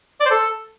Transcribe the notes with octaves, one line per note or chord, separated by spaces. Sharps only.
D5
C5
A4